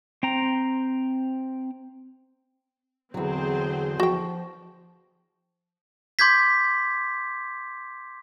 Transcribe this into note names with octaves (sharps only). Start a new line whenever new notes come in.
C4 G5 A#5
E2 D3 F#3 C4 G#4 C5
F3 F#4 G5
C6 D6 G6 G#6 B6